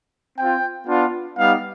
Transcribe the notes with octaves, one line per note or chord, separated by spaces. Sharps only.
C4 F4 G5
B3 D4 F4
G3 B3 D#4 F5